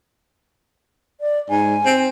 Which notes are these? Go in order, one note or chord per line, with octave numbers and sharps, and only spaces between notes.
D5
G#2 G#5
C4